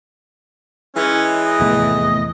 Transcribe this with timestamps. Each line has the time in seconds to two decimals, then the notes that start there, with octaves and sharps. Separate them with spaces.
0.96 E3 G#3 C#4
1.46 D#5
1.60 F1 E2 A2